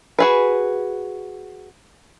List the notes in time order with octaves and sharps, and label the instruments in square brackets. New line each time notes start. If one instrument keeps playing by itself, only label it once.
[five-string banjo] F#4 G#4 B4